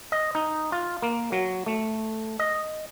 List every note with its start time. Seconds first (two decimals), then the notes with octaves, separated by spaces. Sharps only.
0.12 D#5
0.35 D#4
0.72 F4
1.02 A#3
1.32 F#3
1.66 A3
2.39 D#5